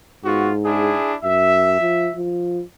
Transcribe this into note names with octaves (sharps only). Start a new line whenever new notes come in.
G#2 B3 F4 F#4
D4 E4 G#4
F#2 E5
F3
F3